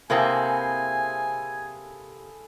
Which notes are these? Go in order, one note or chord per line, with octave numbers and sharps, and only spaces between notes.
C3 A#3 C4 E4 G#4 A4 G#5